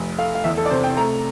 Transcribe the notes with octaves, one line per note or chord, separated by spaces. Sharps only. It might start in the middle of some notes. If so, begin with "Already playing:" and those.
Already playing: F1
A3 F5
F5
E2 E5
A4
D5
C3 C5
G5
A3 A#5